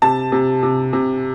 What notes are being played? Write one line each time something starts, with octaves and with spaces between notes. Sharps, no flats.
C3 A5
C3
C3
C3